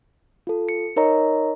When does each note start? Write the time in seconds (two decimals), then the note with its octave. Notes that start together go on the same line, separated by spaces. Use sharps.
0.47 F4 A4
0.69 C#7
0.96 D#4 A#4 C#5 D#5 A#5